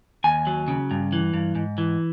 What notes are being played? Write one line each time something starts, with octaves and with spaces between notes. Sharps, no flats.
D#2 G#5
F#3
C#3
G2
E3
G2
G#2
E3